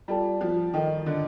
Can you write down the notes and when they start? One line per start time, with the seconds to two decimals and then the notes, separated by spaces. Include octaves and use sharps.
0.08 G3 F4 A4 D5 A5
0.41 F3
0.74 D#3 A4 D#5 G5
1.06 D3